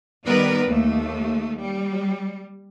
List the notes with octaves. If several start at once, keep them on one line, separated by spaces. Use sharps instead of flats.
D#3 G3 B3 A#4 B4 D5
D#2 A3
G3